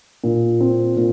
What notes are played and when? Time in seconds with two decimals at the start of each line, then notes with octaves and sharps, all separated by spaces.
0.24 A#2
0.60 C4
0.97 A#2